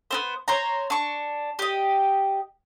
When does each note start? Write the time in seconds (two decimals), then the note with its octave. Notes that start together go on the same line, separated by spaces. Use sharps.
0.11 B3 C4 C5
0.48 C5 C#5 A#5
0.90 D4 C#6
1.59 G4 D#5